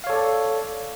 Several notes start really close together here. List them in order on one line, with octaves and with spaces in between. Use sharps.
F5 C#5 A4 D5